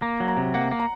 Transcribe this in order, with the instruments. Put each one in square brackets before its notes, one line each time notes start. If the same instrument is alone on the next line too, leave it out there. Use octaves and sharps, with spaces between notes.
[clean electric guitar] A#3 [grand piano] A#5
[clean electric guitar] F#3
[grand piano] A#5
[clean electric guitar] C3
[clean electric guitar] A#3 [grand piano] F#5
[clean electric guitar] A#3
[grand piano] A#5